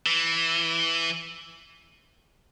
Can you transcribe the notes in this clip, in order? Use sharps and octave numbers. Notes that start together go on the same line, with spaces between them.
E3